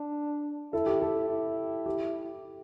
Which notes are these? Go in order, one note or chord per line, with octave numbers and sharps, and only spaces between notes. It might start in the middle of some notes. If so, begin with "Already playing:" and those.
Already playing: D4
E4 A4
G4
A4
E4
G4